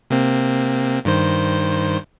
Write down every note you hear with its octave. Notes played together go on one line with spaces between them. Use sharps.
C3 A#3 C4
G2 D#3 C5